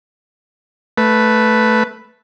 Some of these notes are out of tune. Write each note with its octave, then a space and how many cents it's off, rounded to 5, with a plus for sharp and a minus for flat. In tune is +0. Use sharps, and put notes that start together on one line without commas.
A3 +0 B4 +0